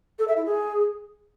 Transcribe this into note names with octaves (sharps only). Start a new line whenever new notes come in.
A4
E5
E4
G#4